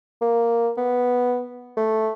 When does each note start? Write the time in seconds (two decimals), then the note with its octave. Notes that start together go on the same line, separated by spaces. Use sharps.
0.21 A#3
0.77 B3
1.77 A3